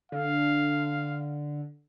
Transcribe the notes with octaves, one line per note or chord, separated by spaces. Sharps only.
D3 F5